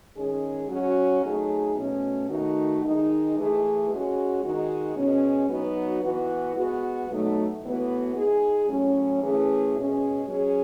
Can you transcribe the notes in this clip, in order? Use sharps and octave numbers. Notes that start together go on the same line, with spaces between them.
D#3 G#3 C#4 G#4
F#3 C#4 F#4
F#3 A3 D#4 G#4
B2 A3 C#4
D#3 A3 D#4 F#4
D#3 G#3 D#4
E3 A3 E4 G#4
G#3 C#4 F#4
D#3 G#3 D#4 F#4
B2 G#3 C#4
F#3 B3 D#4 F#4
E3 B3 F#4
G#3 B3 F#4
B2 F#3 A3 D#4 F#4
A2 E3 B3 F#4
G#3 D#4 G#4
A2 F#3 C#4
E3 A3 C#4 G#4
B2 G#3 C#4 G#4
F#3 C#4 G#4